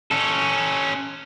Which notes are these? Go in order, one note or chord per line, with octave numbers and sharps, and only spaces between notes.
C#4 A4